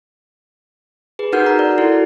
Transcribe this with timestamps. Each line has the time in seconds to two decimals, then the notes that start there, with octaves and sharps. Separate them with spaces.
1.19 G#4 B4
1.32 D#4 F#4 A#4 F#5 F6 G6
1.46 A#5
1.59 D5
1.78 E4 F#4 A4